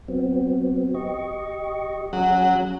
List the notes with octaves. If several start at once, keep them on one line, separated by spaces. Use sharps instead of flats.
F#3 B3 C4
G4 D#5 C#6
F#3 C#4 G#4